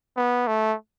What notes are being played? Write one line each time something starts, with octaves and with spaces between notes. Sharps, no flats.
B3
A3